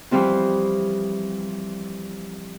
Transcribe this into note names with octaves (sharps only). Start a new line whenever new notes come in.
E3 F3 G3 C4 F4